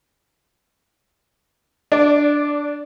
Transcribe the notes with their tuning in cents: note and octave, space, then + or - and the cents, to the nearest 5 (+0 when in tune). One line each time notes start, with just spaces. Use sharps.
D4 +0 D5 -20